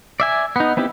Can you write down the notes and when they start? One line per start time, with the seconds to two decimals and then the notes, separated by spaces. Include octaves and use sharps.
0.20 D5 E5 G#5
0.56 B3 D#4
0.77 B3 C4 D#4 E4 G4